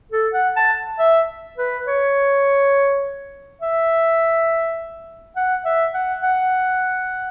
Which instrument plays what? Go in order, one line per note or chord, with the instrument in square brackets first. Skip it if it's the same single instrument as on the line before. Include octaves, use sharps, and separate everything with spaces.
[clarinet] A4
F#5
A5
E5
B4
C#5
E5
F#5
E5
F#5
F#5